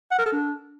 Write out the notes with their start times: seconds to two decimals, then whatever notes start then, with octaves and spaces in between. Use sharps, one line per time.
0.12 F#5
0.19 A#4
0.26 A4
0.33 D4